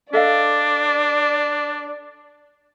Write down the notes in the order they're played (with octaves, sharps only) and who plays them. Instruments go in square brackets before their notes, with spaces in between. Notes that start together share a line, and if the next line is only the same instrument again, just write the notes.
[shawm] D4 [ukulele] A4 D#5 F5 [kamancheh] D5